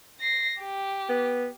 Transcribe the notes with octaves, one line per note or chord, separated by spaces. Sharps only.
A#6 C7
G4
B3